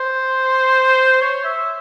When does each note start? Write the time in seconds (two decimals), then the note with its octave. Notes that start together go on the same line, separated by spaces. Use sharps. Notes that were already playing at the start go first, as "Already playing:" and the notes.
Already playing: C5
1.21 C#5
1.44 E5